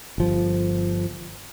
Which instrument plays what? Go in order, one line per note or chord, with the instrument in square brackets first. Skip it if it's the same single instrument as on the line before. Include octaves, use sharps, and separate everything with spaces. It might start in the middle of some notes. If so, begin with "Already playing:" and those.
[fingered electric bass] G1 F3